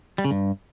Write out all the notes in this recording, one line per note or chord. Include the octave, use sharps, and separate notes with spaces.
G3
C#3
G2